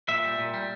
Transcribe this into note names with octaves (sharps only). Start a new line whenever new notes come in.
A#2 E5
G3
A#2
G3